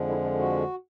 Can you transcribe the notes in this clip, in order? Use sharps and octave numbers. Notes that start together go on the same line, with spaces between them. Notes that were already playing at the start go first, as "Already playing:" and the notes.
Already playing: F2 D3 F3 G#3
E4
F4
F#4